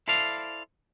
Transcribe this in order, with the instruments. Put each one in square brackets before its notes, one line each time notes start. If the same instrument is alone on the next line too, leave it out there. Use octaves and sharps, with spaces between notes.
[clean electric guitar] E4 A4 C5 D5 F5